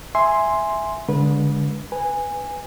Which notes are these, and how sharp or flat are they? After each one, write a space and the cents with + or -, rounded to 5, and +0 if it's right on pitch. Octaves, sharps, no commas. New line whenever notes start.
E5 +0 G#5 +0 C6 +0
D3 -30 G#3 -10 B4 -20
B4 +0 G#5 -15